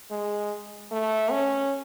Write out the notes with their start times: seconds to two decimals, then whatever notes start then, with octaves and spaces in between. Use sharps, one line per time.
0.10 G#3
0.91 A3
1.31 C#4